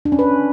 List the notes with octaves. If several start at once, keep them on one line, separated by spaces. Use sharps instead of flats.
D4
C#4
B4